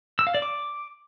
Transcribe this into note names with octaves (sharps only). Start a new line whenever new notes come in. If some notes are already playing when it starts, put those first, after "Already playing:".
E6
F5
D5
D6